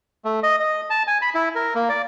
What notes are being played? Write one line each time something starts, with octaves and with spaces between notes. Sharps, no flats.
A3
D#5
D#5
A5
G#5
B5
E4
A#4
A#3
D5